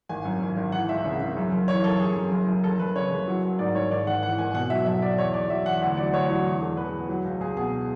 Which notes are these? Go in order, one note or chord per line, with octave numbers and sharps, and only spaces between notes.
G#1 G#5
F#2
G#1
G#1
E3 F#5
C#2 E5
C#3
C#3
F#2
F#1
E3 C#5
F#1 A4
F#1 G#4
F#2
F#1
F#1
F#1 A4
F#1 B4
C#3 C#5
F#1
F#3
F#3
G#2 D5
G#2 C#5
G#1 D5
G#1 F#5
E3 F#5
G#1 G#5
B2 F#5
F#3 E5
B1 E5
F#3 D5
E2 C#5
E2 D5
F#3 E5
E2 F#5
D2 F#5
F#3 D5
D2 C#5
F#3
E2
E1
E1 B4
E2
F#3
C#2
C#2 G#4
B2 G#4